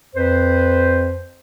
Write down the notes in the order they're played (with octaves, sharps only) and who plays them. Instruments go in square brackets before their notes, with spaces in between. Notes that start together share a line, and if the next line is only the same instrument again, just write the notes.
[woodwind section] F2 B4 C5